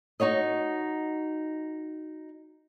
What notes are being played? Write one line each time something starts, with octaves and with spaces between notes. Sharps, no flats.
D#4 F#4 C#5 D#5